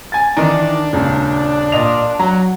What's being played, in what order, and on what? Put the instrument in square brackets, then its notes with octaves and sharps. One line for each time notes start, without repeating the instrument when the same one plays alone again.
[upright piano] G#5 A6
[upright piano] D#3 E3 D#4 [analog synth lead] D4
[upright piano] D#1 C#2
A#2 D#5 F7
[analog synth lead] F#3 [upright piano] A#5